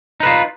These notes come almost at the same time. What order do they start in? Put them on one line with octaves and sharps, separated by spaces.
D#4 B4 F4